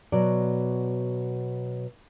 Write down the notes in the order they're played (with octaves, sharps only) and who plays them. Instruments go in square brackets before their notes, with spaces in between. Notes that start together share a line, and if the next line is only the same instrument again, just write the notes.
[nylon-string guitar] B2 F#3 D5